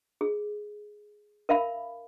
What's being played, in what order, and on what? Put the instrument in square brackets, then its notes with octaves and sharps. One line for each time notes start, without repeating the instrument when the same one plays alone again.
[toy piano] G#4
A#4 E5 F5 B5